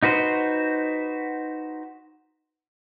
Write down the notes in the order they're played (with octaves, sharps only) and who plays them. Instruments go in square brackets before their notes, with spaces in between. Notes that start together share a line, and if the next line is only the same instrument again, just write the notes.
[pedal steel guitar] D#4 F#4 B4 C5